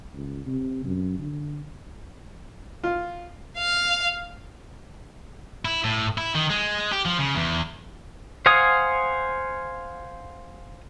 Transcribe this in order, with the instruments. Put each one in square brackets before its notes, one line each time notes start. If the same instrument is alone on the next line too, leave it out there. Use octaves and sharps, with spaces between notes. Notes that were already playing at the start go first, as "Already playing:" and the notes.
[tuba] C#2
C3
F#2
D3
[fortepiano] F4
[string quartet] F5
[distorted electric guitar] E4
A2
E4
D#3
G#3
G4
F3
C#3
E2
[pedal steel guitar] C5 F5 F#5 G#5 D#6